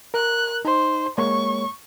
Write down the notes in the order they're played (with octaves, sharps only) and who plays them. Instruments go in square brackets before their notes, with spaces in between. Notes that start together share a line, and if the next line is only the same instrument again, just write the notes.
[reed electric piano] A#4 [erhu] F#6
[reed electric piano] D#4 [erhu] C5
[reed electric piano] G#3 A#3 C#5 [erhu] C#6